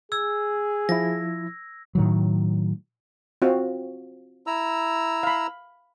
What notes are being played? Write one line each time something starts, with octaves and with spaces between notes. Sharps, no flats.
G#4 E6 G#6
F3 E4 A#6
A2 D#3 F#3
C4 F4 F#4
E4 A#5 E6
F5 B5